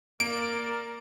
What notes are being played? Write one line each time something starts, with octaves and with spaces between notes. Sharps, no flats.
A#3 A#4 D5 D7